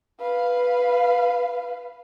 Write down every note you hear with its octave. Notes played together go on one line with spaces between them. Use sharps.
B4 F5